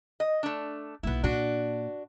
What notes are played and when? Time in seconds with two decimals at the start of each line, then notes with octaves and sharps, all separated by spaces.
0.20 D#5
0.43 A3 D4
1.03 B1 A#3 B3 E4
1.24 A#2 D4 F#4